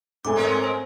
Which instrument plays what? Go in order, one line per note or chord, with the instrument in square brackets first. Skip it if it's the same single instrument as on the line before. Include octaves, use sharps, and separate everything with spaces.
[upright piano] G#2 A3 G#5 [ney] C4 [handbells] D6
[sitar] G#3 C#4 A#4 [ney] C4
[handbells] C5